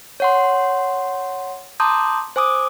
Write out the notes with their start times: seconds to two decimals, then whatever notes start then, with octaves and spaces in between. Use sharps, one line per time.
0.20 C#5 F#5 C6
1.80 A5 A#5 C6 D6 D#6 G6
2.36 C5 G#5 D6 D#6